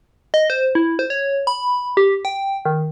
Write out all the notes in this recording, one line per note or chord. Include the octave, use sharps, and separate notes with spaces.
D#5
C5
E4
C5
C#5
B5
G4
G5
D#3